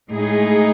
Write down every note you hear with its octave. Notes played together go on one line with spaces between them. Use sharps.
A2 G#3 D#4 G#4